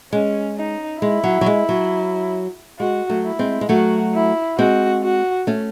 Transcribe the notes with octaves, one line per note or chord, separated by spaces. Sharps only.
G#3 C#4
D#4
G#3 E4
F#3
F#3
G#3
F#3
G#3 F#4
F#3 A3
E4
G#3 C4
G#3
F#3 A3 F#4
E4
G#3 C4 F#4
F#4
A3 C#4